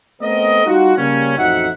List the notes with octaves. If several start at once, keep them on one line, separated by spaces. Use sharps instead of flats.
A3 B3 C4 A4 A#4 D#5
G3 D#4 F4 F#4
C#3 G3 A#3 C#4
A1 F2 D#4 F#4 E5 F#5